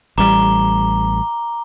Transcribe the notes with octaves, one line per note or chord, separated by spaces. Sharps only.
A1 G3 A#5 D6 G7